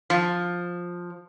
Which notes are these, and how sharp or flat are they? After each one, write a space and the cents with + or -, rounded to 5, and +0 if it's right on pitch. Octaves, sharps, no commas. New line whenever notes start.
F3 +10